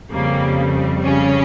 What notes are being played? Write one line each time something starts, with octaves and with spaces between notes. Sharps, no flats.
F2 C#3 G3 A#3
C#3 C#4